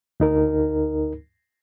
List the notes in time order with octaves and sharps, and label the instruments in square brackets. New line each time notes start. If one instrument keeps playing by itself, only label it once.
[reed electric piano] D2 D#4 A#4